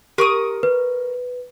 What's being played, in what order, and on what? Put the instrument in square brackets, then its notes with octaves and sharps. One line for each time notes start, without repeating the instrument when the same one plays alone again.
[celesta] G4 [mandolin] A#4 C#6 D#6
[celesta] B4